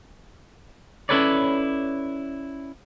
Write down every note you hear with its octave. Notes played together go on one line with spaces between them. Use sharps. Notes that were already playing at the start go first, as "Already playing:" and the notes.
C#4 E4 A4 B4 C#5 D5